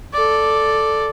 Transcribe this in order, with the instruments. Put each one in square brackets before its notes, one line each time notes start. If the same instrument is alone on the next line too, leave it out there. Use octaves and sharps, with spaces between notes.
[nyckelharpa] A4 D5